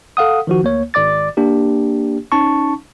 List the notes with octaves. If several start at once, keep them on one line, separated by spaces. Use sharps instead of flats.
A4 F5 F#5 D#6
D#3 F3 F#4
D2 A#3 C#5
G#1 D5 D6 A6
A#3 D4 G4
C#4 D#4 A5 C#6